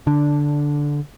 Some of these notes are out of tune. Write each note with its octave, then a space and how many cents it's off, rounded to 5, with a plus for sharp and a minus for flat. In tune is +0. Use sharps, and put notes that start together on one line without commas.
D3 -10 D4 +0